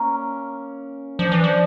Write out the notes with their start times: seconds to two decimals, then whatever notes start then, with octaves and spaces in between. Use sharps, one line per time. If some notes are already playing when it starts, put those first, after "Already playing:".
Already playing: A#3 C#4
1.19 F3 D4
1.32 E3
1.44 F3